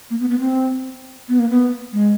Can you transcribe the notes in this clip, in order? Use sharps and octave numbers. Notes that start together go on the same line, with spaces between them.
A#3
B3
B3
C4
B3
A#3
B3
G#3